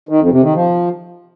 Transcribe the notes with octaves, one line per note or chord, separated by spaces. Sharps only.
D#3
F2
C3
D#3
F3